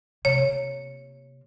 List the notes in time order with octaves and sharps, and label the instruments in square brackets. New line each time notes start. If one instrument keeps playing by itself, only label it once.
[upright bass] C3 A#3 [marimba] C#5